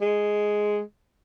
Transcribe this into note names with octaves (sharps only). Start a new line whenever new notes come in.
G#3